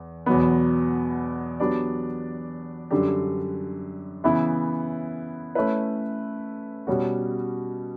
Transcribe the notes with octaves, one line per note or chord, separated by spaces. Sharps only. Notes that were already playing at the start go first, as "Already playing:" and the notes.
Already playing: E2
E2 B2 F#3 B3
F#3 B3 D4 G4 D5
F#2 D3 G3 D4 G4
C#3 E3 B3 E4
A3 C#4 E4 B4
B2 G3 C#4 F#4